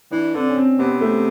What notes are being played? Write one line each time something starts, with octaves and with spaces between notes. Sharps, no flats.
E3 D4
D3 C4
C#4
C4
C3 B3
A3